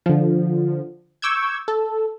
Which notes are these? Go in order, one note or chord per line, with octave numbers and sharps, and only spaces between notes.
D3 F3
C#6 D6 E6 G6 G#6
A4